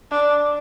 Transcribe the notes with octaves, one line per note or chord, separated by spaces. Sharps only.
D4